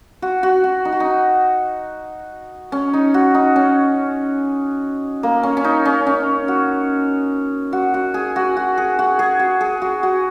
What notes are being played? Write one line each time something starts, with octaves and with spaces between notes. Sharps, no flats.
F#4
F#4
F#4
D#4
F#4
D#4
C#4
D#4
F#4
D#4
C#4
A#3
C#4
C#4
D#4
C#4
C#4
F#4
F#4
F#4
G#4
F#4
F#4
G#4
F#4
G#4
F#4
G#4
F#4
F#4